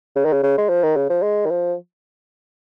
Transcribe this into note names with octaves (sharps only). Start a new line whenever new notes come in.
C#3
D#3
C#3
C#3
G#3
F3
D#3
C#3
F3
G#3
D#3
F3